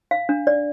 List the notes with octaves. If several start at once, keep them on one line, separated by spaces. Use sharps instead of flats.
F5
D4
D5